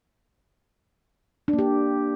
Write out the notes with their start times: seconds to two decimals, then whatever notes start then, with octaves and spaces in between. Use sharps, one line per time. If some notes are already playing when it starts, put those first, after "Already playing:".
1.48 D4
1.53 A#3
1.59 G4